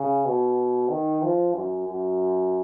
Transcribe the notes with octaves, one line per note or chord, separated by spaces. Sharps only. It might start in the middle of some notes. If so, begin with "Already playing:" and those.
Already playing: C#3
B2
D#3
F3
F#2
F#2